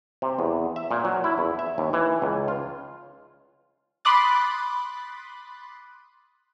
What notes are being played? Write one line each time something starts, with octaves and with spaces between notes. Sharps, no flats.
C3
E2
E5
A#2
F#3
E4
E2
E5
D#2
E3
C#2
F4
B5 C6 D6 D#6 F#6 A6